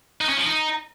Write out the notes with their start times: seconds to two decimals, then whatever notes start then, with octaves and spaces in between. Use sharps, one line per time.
0.21 D#4
0.29 C#4
0.37 F3
0.46 D#4